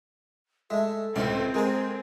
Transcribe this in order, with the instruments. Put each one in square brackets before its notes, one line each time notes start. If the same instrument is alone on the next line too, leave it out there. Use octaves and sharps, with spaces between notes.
[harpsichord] G#3 A3 [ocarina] A4 [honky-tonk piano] E5
[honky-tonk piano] C#2 A2 [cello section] C4 [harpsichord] F4 F5
[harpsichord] G#3 C5 [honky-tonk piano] G#4 A#4 G#5